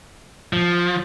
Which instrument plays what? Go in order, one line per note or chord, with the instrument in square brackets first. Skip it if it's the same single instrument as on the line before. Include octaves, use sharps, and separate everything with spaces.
[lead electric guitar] F3